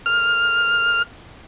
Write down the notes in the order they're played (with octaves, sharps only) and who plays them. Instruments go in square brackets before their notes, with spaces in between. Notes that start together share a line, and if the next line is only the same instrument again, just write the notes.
[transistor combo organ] F6